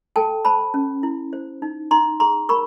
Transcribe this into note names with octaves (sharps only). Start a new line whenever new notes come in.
A4 G5 A5
C5 A5 B5
C#4
E4
C5
D#4
D#4 A#5 C6
G#4 A#5 C6
A#4 B5 C#6